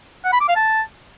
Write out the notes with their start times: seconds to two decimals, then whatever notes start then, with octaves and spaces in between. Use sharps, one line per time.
0.25 F#5
0.33 B5
0.41 D6
0.48 F5
0.56 A5